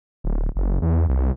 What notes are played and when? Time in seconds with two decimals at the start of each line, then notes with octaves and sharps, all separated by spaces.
0.24 D1
0.56 F#1
0.82 E2
1.09 C2